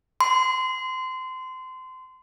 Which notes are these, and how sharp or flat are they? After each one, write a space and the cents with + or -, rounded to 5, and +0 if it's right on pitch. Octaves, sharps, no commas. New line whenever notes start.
C6 -25